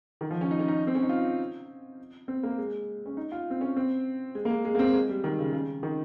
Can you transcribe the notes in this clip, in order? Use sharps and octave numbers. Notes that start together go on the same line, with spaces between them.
D#3
F3
C#4
D#4
C#4
D#4
C4
C#4
D#4
F4
C4
A#3
G#3
C#4
D#4
F4
C4
C#4
C4
G#3
A#3
G#3
G#3
A#3
C4
G#3
G3
D#3
C#3
C#3
D#3